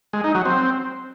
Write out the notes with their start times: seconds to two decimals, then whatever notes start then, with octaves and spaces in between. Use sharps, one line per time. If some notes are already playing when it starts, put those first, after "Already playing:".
0.13 G#3
0.24 D#4
0.35 F#3
0.45 C4